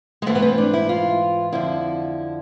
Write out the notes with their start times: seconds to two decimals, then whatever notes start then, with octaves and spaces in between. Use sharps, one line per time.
0.22 G#3
0.26 G#2 E3 A3
0.35 B3
0.42 C4
0.58 D4
0.73 E4
0.89 F4
1.52 F2 D3 F3 E4